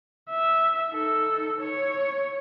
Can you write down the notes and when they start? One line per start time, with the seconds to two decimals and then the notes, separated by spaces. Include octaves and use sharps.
0.30 E5
0.90 D#4 A4
1.60 C#5